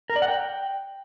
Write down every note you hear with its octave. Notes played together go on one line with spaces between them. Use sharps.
A#4
D5
F#5
G5